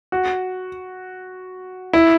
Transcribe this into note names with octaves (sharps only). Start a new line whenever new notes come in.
F#4
E4